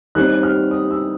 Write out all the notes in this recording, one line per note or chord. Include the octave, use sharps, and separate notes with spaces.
D#2 D#3 G3 C4 F#6
F6
D#6
E6